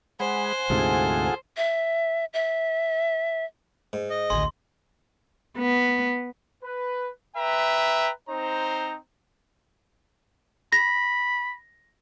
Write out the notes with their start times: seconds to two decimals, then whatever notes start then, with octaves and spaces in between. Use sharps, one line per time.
0.20 G#3 C5 F#5 G#5 B5
0.70 D2 G#2 C3 F4 G#4 A4
1.57 E5
2.34 E5
3.93 G#2
4.10 D#5
4.30 A1 D2 G#4 C6
5.58 B3
6.63 B4
7.36 B4 E5 G5 A#5
8.29 C4 D#4 C5 A#5
10.72 B5 A#6